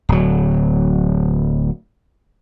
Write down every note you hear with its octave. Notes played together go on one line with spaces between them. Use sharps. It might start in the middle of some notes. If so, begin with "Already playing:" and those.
D1 F#3